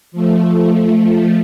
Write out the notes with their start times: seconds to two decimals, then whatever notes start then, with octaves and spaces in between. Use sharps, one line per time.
0.12 F3 A3